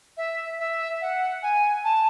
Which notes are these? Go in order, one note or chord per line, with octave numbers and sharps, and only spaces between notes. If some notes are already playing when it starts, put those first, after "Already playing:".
E5
E5
F#5
G#5
A5